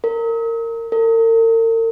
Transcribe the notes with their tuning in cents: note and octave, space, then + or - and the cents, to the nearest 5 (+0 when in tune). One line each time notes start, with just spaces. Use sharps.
A#4 -25
A#4 -45